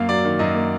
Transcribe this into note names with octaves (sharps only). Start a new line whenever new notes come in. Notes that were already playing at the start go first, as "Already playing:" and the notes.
Already playing: F#2 A#3 F5
F#3 D5
D#3
F#2 D#5
A#3